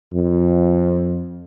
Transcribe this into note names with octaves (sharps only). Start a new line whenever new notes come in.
F2